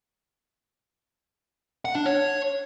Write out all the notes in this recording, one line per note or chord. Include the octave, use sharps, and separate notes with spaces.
F#5
D4
C#5